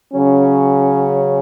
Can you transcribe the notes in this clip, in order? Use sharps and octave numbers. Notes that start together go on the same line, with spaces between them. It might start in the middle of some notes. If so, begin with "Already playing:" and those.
C#3 F#3 C#4